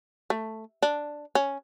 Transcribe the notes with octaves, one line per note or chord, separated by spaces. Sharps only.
A3
D4
C#4